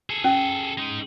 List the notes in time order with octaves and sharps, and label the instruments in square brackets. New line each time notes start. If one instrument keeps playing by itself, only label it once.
[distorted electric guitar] G#4 A4
[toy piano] C#4
[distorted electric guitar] G#3 D#4